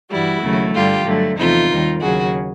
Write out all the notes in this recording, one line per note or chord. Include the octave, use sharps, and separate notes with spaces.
G2 E3 G3 E4 F#4
D#2 C#3 F#3 A3
G2 D3 G3 F4 G4
G2 D3 F#3 A3
E2 C3 F3 A3 D#4 F4
D#2 D#3 G3
D#2 C#3 F#3 F#4 G#4